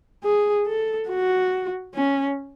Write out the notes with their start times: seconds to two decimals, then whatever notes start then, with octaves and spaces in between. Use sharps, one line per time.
0.24 G#4
0.66 A4
1.09 F#4
1.95 C#4